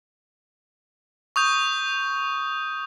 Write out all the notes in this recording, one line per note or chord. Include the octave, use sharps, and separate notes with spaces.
C#6 D#6 G6